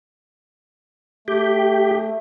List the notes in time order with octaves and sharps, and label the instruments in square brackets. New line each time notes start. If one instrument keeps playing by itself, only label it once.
[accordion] A3 [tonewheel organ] G4